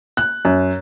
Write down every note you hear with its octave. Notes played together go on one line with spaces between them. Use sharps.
F#6
F#2